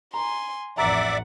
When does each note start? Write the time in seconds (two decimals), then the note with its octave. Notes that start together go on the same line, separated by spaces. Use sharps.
0.14 G#5 A#5 C6
0.78 A1 F2 D5 E5 F#5 A#5 D6